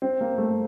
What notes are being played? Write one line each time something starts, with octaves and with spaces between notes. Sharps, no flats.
C4
A#3
A3